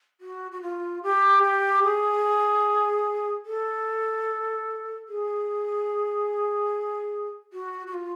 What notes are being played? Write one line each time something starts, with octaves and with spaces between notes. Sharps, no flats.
F#4
F#4
F4
G4
G4
G#4
A4
G#4
F#4
F#4
F4